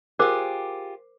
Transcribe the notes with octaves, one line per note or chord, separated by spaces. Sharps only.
F4 G4 G#4 A#4 C5 D6